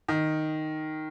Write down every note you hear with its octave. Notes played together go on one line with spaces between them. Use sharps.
D#3